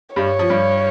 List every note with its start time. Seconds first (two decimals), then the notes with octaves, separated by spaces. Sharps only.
0.16 G2 G3 C#5
0.39 F3
0.49 G2 G3